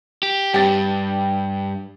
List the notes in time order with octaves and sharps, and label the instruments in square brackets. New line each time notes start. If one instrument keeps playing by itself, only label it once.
[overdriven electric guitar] G4
[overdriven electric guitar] G2 [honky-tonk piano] G4 A6